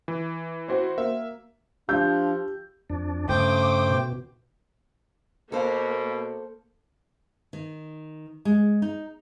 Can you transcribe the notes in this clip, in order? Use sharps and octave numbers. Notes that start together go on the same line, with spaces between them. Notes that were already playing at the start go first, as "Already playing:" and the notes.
E3
F#4 C5
A#3 E5
F3 D4 G4 G6
F2 D4
G2 C#3 A3 C5 G5 D6 D#6
B2
B2 A#3 A4 C5 F5
D#3
G#3
D#4